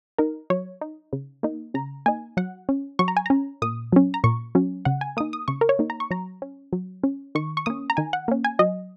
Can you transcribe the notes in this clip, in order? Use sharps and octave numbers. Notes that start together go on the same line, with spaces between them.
D#4 A#4
F#3 C#5
D#4
C#3
A#3 D#4
C#3 A#5
A#3 D#4 G#5
F#3 F#5
C#4
F#3 C#6
A#5
G#5
C#4 A#5
A#2 D#6
F#3 C#4
A#5
A#2 C#6
F#3 C#4
C#3 F#5
G#5
A#3 D#4 D#6
D#6
C#3 C#6
A#4
C#5
A#3 D#4
A#5
C#6
F#3 A#5
C#4
F#3
C#4
D#3 C#6
C#6
A#3 C#4 D#6
A#5
D#3 G#5
F#5
A#3 C#4
G#5
F#3 D#5